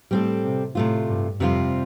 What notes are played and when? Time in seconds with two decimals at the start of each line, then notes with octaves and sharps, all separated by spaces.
0.11 A2 G3 C4 A4
0.43 C3
0.75 A2 C3 A3 F4
1.07 G2
1.40 F2 C3 G3 C4 F4